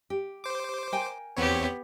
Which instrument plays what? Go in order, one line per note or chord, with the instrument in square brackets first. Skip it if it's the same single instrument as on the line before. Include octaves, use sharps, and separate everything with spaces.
[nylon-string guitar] G4
[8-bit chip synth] C5 D6
[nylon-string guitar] A#4 G5 G#5
[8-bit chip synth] E2 C4 C#5 [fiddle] B3 G4